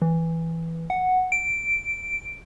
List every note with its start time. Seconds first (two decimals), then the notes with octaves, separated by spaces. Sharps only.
0.02 E3
0.90 F#5
1.32 D7